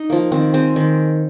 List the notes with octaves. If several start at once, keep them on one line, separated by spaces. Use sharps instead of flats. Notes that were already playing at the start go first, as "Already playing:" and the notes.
Already playing: D#4
F3 A#3
D#3 C4
G#3 C4
D#3